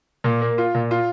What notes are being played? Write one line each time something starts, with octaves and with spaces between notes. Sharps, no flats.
A#2
A#3
F4
A#2
F4